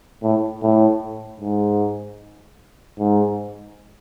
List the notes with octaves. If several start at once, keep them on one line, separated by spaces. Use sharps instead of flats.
A2
A2
G#2
G#2